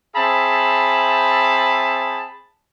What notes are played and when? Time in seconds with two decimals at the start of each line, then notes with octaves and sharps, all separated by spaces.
0.16 C4 G#4 E5 A5 B5